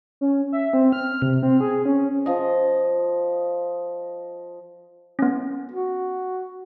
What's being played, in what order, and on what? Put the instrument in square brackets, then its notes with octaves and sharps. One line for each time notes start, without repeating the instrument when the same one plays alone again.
[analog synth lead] C#4
E5
C4
F6
C3
C4
G#4
C#4
[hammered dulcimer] F3 D#5
[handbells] B3 C#4
[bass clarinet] F#4